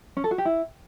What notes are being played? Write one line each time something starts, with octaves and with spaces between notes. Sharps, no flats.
C#4
A4
F#4
G4
E4